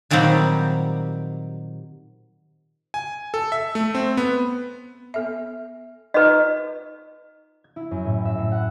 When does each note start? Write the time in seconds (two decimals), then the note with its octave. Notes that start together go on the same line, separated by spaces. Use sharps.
0.10 A#2 D#3 F#3 G3 C4 G4
2.94 G#5
3.34 A4
3.52 E5
3.75 A3
3.95 C4
4.17 B3
5.14 B3 A4 E5
6.14 D#4 F4 B4 D#5 A#5
7.64 G#6
7.76 E4
7.91 F#2
8.05 A2
8.25 E5
8.38 A2
8.52 F#5